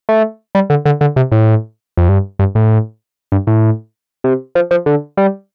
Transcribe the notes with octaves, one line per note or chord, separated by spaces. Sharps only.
A3
G3
D3
D3
D3
C3
A2
F2
G2
G2
A2
G2
A2
C3
F3
F3
D3
G3